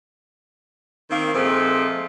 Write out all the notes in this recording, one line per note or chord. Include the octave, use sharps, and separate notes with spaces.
D#3 A#3 C4
A#2 F3 G#3 A3 C4